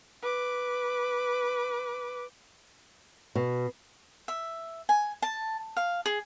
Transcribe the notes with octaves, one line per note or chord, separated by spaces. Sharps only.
B4 D6
B2
E5
G#5
A5
F5
G#4